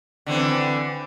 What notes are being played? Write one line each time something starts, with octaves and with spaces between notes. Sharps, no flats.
D3 E3 C4